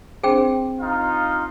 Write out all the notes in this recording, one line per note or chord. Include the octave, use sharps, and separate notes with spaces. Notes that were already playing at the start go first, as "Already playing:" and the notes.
C4 D4 G#4 C5 G5
D#4 F4 F5